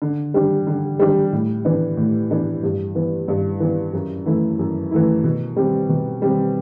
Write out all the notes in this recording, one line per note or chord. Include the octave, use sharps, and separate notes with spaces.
D3
G3 D4
D3
G3 D4
A2
E3 B3 D4
A2
E3 B3 D4
G2
E3 B3
G2
E3 B3
F#2
E3 A3 E4
F#2
E3 A3 E4
B2
G3 C4
B2
G3 C4